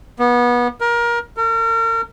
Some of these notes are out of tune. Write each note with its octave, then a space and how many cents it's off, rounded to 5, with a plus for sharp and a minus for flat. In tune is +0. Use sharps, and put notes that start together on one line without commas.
B3 -25
A#4 +25
A#4 -40